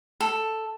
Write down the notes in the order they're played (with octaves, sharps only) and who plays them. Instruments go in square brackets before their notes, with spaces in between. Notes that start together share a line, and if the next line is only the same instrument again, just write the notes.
[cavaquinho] A4